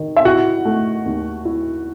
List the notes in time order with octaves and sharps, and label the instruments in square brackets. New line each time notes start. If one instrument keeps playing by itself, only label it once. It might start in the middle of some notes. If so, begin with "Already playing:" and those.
Already playing: [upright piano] D#3
E5
E4 F#4 F#5
A3
D#2
E4